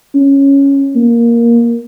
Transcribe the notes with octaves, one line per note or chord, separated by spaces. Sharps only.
C#4
A#3